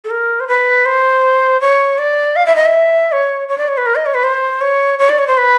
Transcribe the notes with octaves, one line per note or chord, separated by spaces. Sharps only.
A4
A#4
C5
B4
C5
C#5
D5
F5
E5
D#5
E5
C#5
C#5
D5
C#5
B4
A#4
D#5
C#5
B4
C5
C#5
C#5
D5
C#5
C5
B4